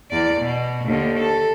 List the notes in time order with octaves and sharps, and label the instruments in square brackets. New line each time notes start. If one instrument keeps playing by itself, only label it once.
[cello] E2 D5
B2
D#2 D3
A4